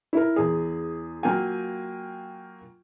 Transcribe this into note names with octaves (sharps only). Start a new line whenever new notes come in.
E4 A#4
E2 G#4
F#3 A#3 F4 G5 G#5